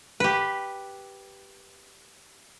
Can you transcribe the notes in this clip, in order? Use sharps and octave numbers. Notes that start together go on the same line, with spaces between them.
G4 B4